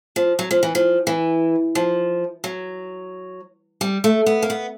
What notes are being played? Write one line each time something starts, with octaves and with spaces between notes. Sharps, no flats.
F3
F#3
F3
E3
F3
E3
F3
F#3
G3
A3
B3
A#3
B3